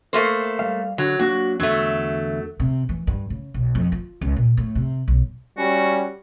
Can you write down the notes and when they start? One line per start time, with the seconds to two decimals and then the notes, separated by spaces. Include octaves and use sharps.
0.13 A3 A#3 C5
0.59 G3 F5
0.98 D3 F#3
1.19 F#3 A#3 D4 F#4
1.60 E2 D3 F#3 A3 E5
2.60 C3
2.89 E3
3.07 G2
3.30 C#3
3.54 B1
3.75 F2
3.92 F4
4.21 C#2
4.36 A#2
4.57 A2
4.75 C3
5.08 B1
5.58 G3 C#4 F#4